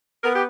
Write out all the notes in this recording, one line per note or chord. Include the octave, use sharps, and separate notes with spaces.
B3 A#4
G4